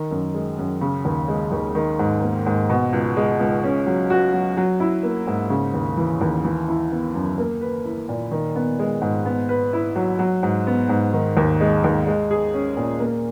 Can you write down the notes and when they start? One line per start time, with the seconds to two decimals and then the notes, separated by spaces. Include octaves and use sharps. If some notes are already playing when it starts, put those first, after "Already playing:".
Already playing: D#3
0.11 F#2
0.34 G#3
0.58 F#2
0.81 C#3
1.05 D#2
1.28 G#3
1.52 D#2
1.75 D#3
1.99 G#2
2.22 A#3
2.46 G#2
2.70 B2
2.93 C#2
3.17 G#3
3.39 C#2
3.64 C#4
3.87 F#3
4.10 F#4
4.33 F#3
4.57 F#3
4.80 E4
5.03 A#3
5.27 G#2
5.50 C#3
5.74 D#2
5.97 E3
6.21 D#2
6.45 E3
6.68 E4
6.91 B3
7.15 F#2
7.38 A#3
7.61 B4
7.85 E4
8.09 A#2
8.31 D#3
8.55 B3
8.79 G#3
9.02 G#2
9.25 B3
9.49 B4
9.73 E4
9.96 F#3
10.19 F#3
10.43 G#2
10.67 B3
10.89 G#2
11.13 D#3
11.37 D#2
11.61 G#3
11.84 D#2
12.07 G#3
12.31 G#4
12.54 C#4
12.77 A#2
13.00 A#3